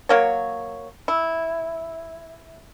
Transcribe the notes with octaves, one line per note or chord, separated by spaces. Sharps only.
F#3 A#3 C#5
E4